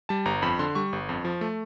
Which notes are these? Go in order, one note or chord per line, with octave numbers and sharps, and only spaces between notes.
G3 A5
G1 A#5
F2 B5
D3 C6
G3 C#6
G1
F2
F3
A3